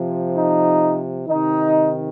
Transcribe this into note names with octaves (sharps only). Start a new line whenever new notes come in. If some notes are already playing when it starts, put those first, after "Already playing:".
Already playing: C3 F3
D#4
C3 D#3 D#4